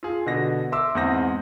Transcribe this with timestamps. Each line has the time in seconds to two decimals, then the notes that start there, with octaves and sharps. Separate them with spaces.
0.03 F4 G#4
0.26 B2 D3 A#6
0.72 E5 C6 D6 E6
0.95 E2 G#2 C4 D#6 G6 A#6